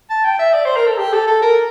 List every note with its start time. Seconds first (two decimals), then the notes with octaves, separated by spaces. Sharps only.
0.10 A5
0.24 G5
0.39 E5
0.54 D5
0.65 C5
0.76 A#4
0.87 A4
0.98 G4
1.13 A4
1.27 A4
1.42 A#4